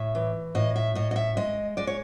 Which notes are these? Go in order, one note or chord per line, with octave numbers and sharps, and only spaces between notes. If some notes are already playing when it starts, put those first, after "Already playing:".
Already playing: A2 E5
E3
A2 D#5
E5
A2 D#5
D#5
E5
G#3 D#5
G#3 D5
C#5